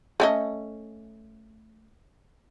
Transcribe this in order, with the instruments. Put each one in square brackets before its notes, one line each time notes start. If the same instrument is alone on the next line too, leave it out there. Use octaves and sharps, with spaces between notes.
[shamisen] A3 C#4 D#5